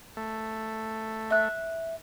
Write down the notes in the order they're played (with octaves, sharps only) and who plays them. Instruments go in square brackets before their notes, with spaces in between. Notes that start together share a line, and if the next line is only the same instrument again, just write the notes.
[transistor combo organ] A3
[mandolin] E5 F#6